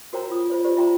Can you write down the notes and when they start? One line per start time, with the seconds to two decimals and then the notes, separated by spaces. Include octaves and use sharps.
0.13 F#4 A#4 C5 C#5 G5 A#5
0.30 F4 D#6
0.50 F4 C5 C#5
0.65 G4 C5 D5
0.77 F4 E5 G5 A#5 C6